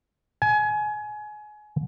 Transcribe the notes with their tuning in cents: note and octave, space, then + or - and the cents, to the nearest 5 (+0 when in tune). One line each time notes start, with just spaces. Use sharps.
G#5 +25